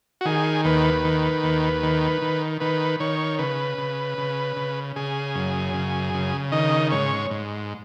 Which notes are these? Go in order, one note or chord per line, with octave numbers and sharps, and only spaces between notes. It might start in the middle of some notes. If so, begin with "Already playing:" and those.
F#4
D#3 G#4
D#2 B4
D#3
D#2
D#3
D#3
D#3 B4
D#3 C#5
C#3 B4
C#3
C#3
C#3
C#3 G#4
F#2
C#3
C#3
D#3 D#5
G#2 C#5
G#2